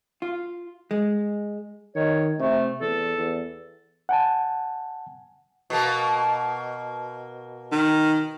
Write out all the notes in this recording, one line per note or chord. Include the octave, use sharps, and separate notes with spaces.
F4
G#3
D#3 C#5
C3 A3
E2 A4
E2
F#5 G#5 A5
B2 A#3
D#3